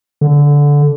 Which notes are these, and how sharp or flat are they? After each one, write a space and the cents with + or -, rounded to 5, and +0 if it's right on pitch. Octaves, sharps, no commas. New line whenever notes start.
D3 -15